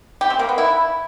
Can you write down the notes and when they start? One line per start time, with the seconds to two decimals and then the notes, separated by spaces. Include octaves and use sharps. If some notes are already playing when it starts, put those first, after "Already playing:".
0.21 G4
0.30 C4
0.39 A#3
0.49 B3
0.58 E4